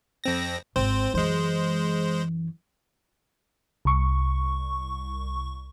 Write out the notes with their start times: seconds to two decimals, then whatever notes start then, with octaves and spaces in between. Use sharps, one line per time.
0.24 F2 C4 A#6
0.76 G#1 C4 C5
1.14 F#2 E3 G#3 C5
3.85 C2 C#6